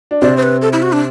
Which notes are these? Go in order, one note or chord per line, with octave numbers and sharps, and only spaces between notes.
D4
C3 C4 D5
C5
B4
A4
E4
F#4
D4